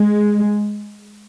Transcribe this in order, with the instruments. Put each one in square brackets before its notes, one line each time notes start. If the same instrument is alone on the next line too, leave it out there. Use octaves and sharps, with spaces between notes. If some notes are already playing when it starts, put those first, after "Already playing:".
Already playing: [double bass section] G#3